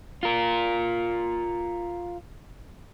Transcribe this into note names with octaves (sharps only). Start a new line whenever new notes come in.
F4 A#4